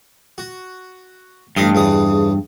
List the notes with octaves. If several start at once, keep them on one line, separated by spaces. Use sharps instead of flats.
F#4
A1 G2 D#5 F5
E2 C#3 D#6